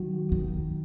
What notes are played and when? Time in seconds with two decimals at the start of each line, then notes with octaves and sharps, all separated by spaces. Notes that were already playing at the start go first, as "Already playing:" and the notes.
Already playing: D#3 F#3
0.32 D#3